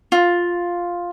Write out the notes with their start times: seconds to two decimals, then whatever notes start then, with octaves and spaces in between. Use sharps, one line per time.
0.12 F4